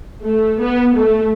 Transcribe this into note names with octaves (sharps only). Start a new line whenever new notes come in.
A3
B3
A3